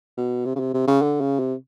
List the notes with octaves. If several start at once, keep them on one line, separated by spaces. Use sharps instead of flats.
B2
C3
C#3
C3
C3
C#3
D3
C#3
C3